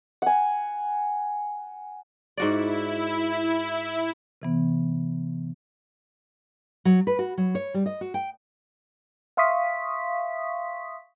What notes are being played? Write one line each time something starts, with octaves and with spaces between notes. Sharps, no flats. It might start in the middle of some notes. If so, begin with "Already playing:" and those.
F#5 G#5
G#2 E4 F#4 D5
C3 E3 B3
F#3
B4
F#4
F#3
C#5
G3
D#5
F#4
G5
E5 F5 C6 C#6 D#6 B6